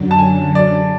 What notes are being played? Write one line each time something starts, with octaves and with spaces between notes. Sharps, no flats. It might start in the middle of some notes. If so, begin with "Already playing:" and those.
Already playing: F#2 D3 F#3
A5
G#5
D5